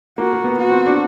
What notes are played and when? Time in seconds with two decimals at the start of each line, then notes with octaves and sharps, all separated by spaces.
0.18 A#3 F#4
0.33 A#3
0.44 B3
0.58 F#4
0.70 C4
0.86 D4